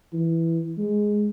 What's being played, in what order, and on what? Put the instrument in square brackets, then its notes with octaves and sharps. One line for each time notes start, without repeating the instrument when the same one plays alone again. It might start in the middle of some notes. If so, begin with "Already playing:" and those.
[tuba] E3
G#3